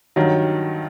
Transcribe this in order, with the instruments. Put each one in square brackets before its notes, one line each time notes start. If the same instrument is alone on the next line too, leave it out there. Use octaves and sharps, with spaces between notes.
[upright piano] G2 D#3 F#3